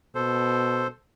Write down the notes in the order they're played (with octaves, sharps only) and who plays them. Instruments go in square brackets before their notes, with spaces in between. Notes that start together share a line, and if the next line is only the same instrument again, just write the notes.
[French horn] B2 [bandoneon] A4 C5